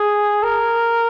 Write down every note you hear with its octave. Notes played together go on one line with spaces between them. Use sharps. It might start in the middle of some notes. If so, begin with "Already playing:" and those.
Already playing: G#4
A#4